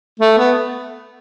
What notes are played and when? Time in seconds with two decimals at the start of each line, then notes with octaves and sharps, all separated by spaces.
0.20 A3
0.38 B3